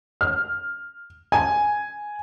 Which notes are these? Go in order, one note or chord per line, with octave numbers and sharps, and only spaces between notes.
F6
G#5